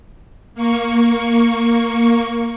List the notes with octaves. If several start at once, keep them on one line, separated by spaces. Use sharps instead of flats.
A#3 C#6